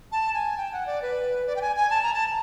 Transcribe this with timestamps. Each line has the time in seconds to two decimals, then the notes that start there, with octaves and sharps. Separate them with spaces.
0.12 A5
0.34 G#5
0.57 G5
0.72 F#5
0.87 D5
1.02 B4
1.47 D5
1.56 G5
1.61 G#5
1.76 G#5
1.90 A5
2.03 A#5
2.14 A5